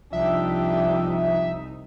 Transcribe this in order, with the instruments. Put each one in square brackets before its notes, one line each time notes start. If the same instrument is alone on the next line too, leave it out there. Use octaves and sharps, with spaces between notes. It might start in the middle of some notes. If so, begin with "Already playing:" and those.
[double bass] C2 D#4 [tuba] F3 [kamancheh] D4 G4 [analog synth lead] E5